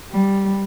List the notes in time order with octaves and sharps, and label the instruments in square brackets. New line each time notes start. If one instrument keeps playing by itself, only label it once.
[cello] G3